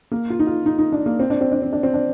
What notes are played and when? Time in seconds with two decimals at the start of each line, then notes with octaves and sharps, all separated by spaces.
0.11 A#3
0.30 F4
0.39 D#4
0.47 F4
0.66 D#4
0.78 D#4
0.92 D4
1.06 A#3
1.20 C4
1.30 D4
1.41 C4
1.52 D4
1.62 C4
1.73 D4
1.83 C4
1.94 D4